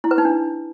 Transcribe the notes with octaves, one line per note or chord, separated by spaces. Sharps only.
E4
B4
D#4
D4